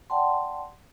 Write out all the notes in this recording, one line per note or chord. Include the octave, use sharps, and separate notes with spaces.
D5 F#5 G5 A5 C6